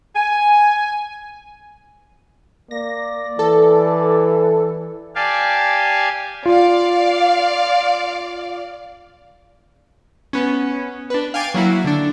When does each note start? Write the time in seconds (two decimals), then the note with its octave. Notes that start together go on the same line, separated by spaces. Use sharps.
0.15 G#5
2.71 A#3 D5 A#6
3.39 E3 A4
5.15 G4 D5 F5 G#5 A5
6.46 F4 D5 F5
10.33 B3 C#4
11.10 D4 B4
11.34 F5 G5 G#5 D6 A6 D7
11.54 F#3 A#3 E4 F#4
11.84 D3 D4